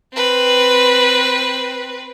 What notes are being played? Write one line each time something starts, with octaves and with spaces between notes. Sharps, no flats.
C4 B4